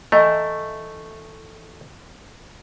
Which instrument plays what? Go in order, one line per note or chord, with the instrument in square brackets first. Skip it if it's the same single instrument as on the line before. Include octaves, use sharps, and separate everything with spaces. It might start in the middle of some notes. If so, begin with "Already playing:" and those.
[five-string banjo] E3 D#5 A#5 [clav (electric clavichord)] A3